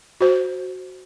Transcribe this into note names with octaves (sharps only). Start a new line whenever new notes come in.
F#4 C5